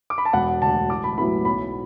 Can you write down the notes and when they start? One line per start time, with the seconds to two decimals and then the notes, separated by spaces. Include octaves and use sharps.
0.10 D6
0.18 B5
0.25 A5
0.33 E1 F#5
0.62 D2 D3 A5
0.90 A1 D6
1.04 B5
1.17 A2 F#3 B3 E4 B5
1.45 B1 B5